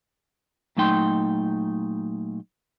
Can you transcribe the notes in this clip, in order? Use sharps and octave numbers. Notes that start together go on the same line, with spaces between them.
A#2 F#3 A3 D#4 G5 C6